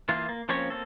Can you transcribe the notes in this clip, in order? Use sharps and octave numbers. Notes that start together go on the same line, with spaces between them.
E3 A#3 F4
A#3
F3 A#3 C4 C#4 C#5
A#3 C4 A4